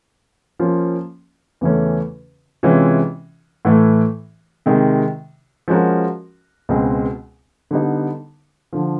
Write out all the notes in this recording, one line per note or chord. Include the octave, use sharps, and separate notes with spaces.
F3 A#3 C#4 F4
E2 C#3 E3 A3 C#4
C3 E3 G#3 C#4 F4
A2 E3 A3
C3 D#3 G#3
F3 G#3 C#4 F#4 A#4
C#2 B2 G#3 C4
D3 G3 B3 D#4
D3 F3